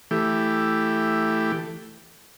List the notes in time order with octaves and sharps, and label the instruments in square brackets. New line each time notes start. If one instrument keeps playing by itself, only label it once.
[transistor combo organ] E3 A3 G4